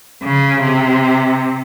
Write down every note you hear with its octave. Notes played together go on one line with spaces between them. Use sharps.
C#3
C3